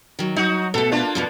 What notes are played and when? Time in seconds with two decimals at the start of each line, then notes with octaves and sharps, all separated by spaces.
0.19 D#3 F#3
0.36 F#3 D#4 F#4
0.74 B2 A3 A4
0.92 A#3 D4 F4
1.15 F2 B2 F3